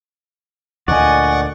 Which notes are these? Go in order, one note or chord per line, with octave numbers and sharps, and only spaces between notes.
D2 A#2 D5 D#5 F#5 G#5 C#6